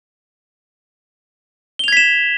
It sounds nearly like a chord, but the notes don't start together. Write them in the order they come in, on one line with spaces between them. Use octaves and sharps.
G7 F7 G#6 B6 E7